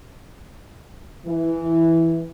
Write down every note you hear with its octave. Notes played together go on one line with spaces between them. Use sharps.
E3